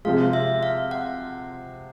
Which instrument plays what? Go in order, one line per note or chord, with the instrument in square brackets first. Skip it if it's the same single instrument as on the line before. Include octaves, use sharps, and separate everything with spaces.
[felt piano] C3 F3 G#3 [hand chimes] F5
[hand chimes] E5
F5
F#5